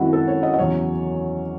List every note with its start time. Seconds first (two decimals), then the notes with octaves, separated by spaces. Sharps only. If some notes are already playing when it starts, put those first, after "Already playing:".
Already playing: F#2 D#3 G#3 C4 E4 F#4
0.13 A4
0.28 C#5
0.43 D#5
0.54 D#5
0.58 E2 C#3 F#3 C#4 C#5